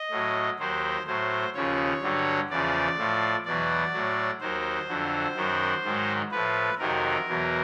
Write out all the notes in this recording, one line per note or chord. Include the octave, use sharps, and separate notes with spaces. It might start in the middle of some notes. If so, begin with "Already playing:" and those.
Already playing: D#5
A2 F#3
D#2 D#3 F#3 C5
A2 F#3 C5
D#2 C#3 F3 C#5
G2 D3 F#3
E2 C#3 F3 D5
A2 F3
E2 B2 F#3 D5
A2 F#3
D#2 D#3 F#3 C5
F2 D3 F#3
F#2 D#3 F#3
G#2 D#3 F#3
A2 F3 B4
F2 C3 D#3 F#3 A#4
E2 B2 F#3